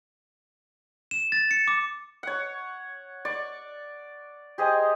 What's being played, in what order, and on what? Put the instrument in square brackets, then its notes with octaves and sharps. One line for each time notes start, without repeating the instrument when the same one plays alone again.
[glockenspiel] E7
A6
C#7
D6
[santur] C#5 F#5
D5 C#6
G4 G#4 C5 D#5